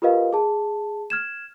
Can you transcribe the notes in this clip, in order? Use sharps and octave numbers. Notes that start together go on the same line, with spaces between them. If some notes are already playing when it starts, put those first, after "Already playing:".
F4 G4 A#4 B4 D#5 F5
G#4 A5
F6 G#6 E7